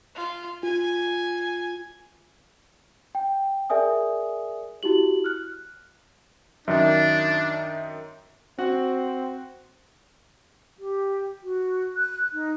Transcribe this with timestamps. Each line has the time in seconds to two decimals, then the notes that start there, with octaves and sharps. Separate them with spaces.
0.15 F4
0.63 F4 G#5
3.15 G5
3.70 G#4 A#4 D5 E5 G#5 D#6
4.83 E4 F#4 G4 F#7
5.24 F6 F#6
6.68 F#2 D#3 D4 E5
8.59 C4 F#4 F#5
10.79 G4
11.43 F#4
11.96 F#6
12.33 D#4